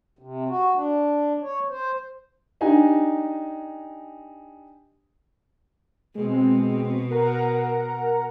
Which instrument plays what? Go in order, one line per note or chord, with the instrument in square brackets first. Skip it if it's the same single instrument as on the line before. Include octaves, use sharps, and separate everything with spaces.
[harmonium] C3
F#4
D4
C#5
C5
[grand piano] D4 D#4 G4 G#5
[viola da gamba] B2 [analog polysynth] G#3 C4
[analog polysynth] A#4 F#5 A#5